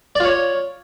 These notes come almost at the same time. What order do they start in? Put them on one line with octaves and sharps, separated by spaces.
D5 F4 C#5